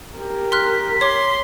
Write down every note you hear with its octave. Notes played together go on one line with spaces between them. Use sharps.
G4 A#4
C6 F6 F#6 B6
C#5 C6 D6